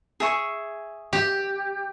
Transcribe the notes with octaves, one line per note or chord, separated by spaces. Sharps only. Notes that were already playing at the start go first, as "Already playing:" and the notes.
G#4 E5 C#6
G4